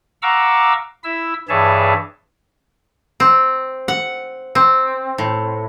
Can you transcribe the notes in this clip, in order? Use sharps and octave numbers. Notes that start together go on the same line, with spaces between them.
F5 F#5 A#5 C#6 D6 E6
E4 E5 E6
G2 E3 G#4 C#5 E5 A5
C4
F#5
C4
A2